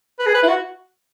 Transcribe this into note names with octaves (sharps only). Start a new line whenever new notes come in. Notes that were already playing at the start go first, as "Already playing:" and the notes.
B4
G#4
B4
E4
F#4